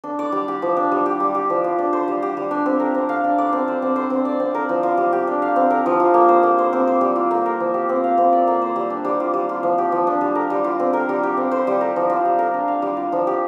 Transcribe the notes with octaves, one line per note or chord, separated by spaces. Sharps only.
D4
D5
G3
G4
F3
D4
G3
G4
G3
G4
F3
F4
D4
C5
G3
G4
G3
D4
C4
A#4
C4
F5
D4
D5
C4
C5
C4
C5
C4
D5
C4
A#4
F3
F4
G3
G4
D4
F5
C4
A#4
F3
F4
A#3
C5
A#3
C5
C4
C5
G3
F4
A#3
A#4
F3
G4
C4
F5
C4
D5
A#3
C5
G3
D4
G3
F4
G3
F4
F3
G4
F3
D4
G3
A#4
G3
F4
C4
A#4
G3
G4
C4
C5
G3
A#4
F3
F4
G3
A#4
D4
F5
G3
F4
F3
G4